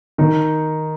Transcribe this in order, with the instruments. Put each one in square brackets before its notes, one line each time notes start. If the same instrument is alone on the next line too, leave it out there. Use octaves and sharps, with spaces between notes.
[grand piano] D#3 D#4